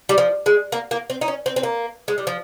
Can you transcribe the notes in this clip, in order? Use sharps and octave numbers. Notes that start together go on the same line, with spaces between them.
G3
F3
G#3
A#3
A#3
C4
D#4
C#4
C4
C4
A#3
G#3
G3
F3